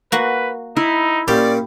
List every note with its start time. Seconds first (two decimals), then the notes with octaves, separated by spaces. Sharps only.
0.12 A#3 F#4 B4
0.77 D#4 E4
1.28 A#2 G3 C#4 G4 D5